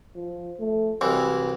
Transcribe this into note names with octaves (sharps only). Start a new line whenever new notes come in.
F3
A3
C2 E3 F#3